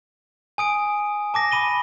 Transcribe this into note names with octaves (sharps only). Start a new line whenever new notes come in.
G#5 D#6 D7
A5 D6 A#6
B5 D#7 G7